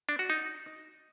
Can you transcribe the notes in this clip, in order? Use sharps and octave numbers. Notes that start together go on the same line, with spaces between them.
D4
F#4
D#4